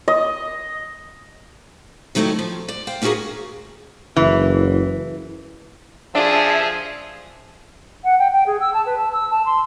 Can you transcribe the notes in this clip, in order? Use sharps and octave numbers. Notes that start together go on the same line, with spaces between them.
D#5
D#3 F#3 A3 C4 D#4 E4
F3
D5
C5 F5 G5
A#3 C#4 F4 F#4 G#4 A#4
F#1 E3
F3 D4 G#4 E5
F#5
G5
G5
G#4
E6
A5
B4
A5
E6
A5
C6